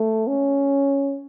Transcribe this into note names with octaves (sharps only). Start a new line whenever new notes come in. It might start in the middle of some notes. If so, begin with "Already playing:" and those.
Already playing: A3
C#4